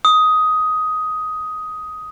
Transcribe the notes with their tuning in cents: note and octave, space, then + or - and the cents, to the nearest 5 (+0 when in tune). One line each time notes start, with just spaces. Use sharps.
D#6 +10